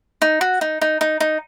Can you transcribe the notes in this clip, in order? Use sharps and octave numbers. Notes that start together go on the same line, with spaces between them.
D#4
F#4
D#4
D#4
D#4
D#4